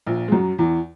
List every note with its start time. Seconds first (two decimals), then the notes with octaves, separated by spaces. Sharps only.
0.07 A#1 A#2
0.28 G#3
0.32 F#2 F#3
0.58 E2 E3